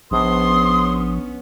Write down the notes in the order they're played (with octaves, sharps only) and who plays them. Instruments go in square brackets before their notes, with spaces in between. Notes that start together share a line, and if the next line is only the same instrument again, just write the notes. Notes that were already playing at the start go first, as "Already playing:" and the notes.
[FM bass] A#1 [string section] B3 C#4 [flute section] C6 D#6